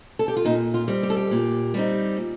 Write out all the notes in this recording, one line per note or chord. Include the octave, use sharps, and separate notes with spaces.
A4
G4
F4
A#2 D#4
F4
G3 C4 D#4
G4
A4
G4
A#2
G3 C4 D#4
A#2